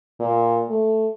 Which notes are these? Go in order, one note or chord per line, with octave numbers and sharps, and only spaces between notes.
A#2
A3